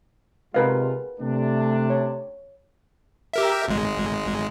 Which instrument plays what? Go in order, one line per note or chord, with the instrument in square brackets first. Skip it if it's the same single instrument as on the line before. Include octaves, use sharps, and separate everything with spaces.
[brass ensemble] C3 G#3 F4 [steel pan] A#4 B4 F5
[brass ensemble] C3 A3 D4
[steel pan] C#5
[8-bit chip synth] G4 A#4 E5
G#1 G#3